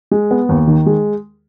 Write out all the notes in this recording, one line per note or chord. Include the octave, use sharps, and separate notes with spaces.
G#3
B3
D#2
D#3
G#3